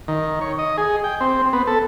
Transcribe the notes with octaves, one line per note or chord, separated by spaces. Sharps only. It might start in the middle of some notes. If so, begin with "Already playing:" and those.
D#3
C#5
D#5
G#4
G5
C4
B3
A4